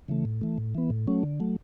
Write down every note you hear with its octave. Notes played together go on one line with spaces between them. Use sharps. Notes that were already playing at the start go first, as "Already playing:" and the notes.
C#3 E3 A3
A2
E3 A3
A2
E3 B3
A2
F#3 A3 C#4
D3
F#3 A3